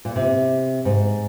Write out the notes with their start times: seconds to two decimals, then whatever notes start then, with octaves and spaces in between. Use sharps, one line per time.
0.05 A#2
0.16 C3
0.85 G#2